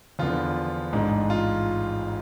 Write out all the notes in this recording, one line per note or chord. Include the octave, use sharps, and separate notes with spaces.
E2 D3 F3 B3 D4 F4
A1 G#2 G#3 D4
F4